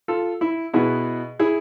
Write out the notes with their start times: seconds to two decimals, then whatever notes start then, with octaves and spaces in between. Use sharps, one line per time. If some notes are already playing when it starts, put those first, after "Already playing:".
0.08 F4 A4
0.41 E4
0.73 B2 B3 E4 G#4
1.39 E4 G#4